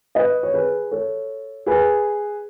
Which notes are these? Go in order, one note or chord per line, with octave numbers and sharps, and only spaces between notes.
B4 D#5
C#5
G#4 B4
A4 C#5
G#4 B4